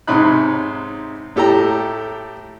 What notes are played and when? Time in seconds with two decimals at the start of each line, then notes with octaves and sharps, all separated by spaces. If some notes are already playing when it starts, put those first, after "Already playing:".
0.07 G#2 C3 C#4 D#4 B5 F#6
1.36 A2 G4 A4 G5 A#5